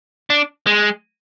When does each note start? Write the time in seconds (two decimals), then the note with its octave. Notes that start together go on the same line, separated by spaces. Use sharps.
0.30 D4
0.67 G#3